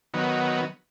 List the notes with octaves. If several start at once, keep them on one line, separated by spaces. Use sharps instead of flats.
D#3 F#3 B3